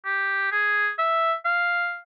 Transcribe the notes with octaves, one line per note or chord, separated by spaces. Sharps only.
G4
G#4
E5
F5